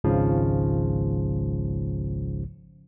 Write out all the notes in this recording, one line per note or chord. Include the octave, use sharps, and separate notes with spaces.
G#1 C#2 G#2 C#3 F3